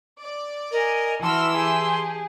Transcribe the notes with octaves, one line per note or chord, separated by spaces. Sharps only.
D5
A#4 D#5 G#5
E3 F#4 A5 C6 E6 F6
G4 G#4